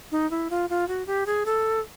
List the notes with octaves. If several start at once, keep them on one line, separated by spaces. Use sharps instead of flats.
D#4
E4
F4
F4
F#4
G4
G#4
A4